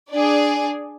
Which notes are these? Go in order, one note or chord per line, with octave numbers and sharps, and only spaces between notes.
D4 G#4 D5